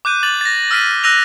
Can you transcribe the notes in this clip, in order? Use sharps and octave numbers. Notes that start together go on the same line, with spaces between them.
D6 F#6 G6 D#7
D6 A6 F#7
A6 A#6
E6 F6 B6 D#7
E6 F#6 A#6 D#7 F7